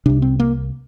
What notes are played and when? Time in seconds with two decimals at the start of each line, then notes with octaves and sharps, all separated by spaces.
0.06 C2 C3 D4
0.22 C4
0.40 A#3